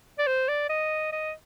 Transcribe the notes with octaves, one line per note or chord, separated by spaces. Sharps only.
D5
C5
D5
D#5
D#5